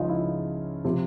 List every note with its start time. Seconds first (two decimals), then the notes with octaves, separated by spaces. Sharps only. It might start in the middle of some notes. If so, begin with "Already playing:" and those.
Already playing: C#2 C#3 F3 D#4 F4
0.09 E4
0.85 C3 F3